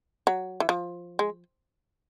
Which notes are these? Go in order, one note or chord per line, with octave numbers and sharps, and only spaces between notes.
F#3
E3
F3
G#3